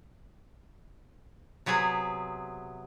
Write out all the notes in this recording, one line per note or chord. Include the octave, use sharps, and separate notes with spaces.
C3 F#3 B3 G#4